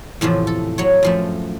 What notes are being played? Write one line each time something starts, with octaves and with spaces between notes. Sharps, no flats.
E2 A2 C3 F3
A4
F#3 C#5
F#2 F3 A3